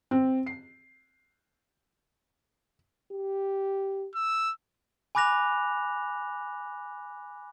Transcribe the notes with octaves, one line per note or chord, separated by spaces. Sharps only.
C4
C7
G4
E6
G#5 B5 D6 F#6 A#6 F7